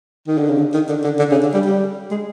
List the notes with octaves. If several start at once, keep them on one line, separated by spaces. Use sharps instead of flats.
D#3
D3
C#3
D3
D#3
D3
D3
D3
C#3
D3
G3
G3
G#3